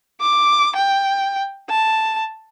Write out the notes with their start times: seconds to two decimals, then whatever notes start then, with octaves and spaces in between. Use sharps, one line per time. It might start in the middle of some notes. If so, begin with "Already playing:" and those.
0.21 D6
0.76 G5
1.70 A5